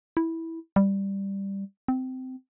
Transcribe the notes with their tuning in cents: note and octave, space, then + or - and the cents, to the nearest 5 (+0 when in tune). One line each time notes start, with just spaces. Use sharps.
E4 -10
G3 +5
C4 -20